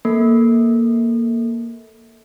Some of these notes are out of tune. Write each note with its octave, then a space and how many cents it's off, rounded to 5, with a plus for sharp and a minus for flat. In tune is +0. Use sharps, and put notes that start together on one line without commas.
A#3 +0 A4 +0